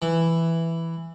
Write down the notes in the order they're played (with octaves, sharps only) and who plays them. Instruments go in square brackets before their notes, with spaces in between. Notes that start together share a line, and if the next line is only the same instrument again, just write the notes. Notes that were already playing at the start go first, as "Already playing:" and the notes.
[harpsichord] E3